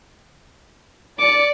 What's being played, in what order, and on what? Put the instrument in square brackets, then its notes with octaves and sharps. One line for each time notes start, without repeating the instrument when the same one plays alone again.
[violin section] D5 [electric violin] D6 C#7